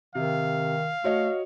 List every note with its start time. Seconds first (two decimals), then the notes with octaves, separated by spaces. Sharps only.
0.15 C3 D#3 F5
1.04 A3 F#4 C#5 D#5